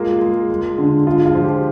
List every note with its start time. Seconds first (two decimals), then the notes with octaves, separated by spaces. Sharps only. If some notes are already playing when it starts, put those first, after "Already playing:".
Already playing: G#3 A#3 F4
0.22 G#3
0.50 G#3
0.78 D3
1.06 G#3 F4
1.26 F4
1.35 F3
1.44 G4